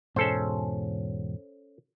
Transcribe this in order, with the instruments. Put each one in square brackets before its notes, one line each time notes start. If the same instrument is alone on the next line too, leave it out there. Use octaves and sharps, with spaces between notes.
[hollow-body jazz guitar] E2 G#2 B2 [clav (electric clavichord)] C#4 A4 C5